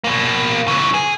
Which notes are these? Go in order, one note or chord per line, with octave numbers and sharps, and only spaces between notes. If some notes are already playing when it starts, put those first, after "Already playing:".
B2 A#3
C#3 E3
G#4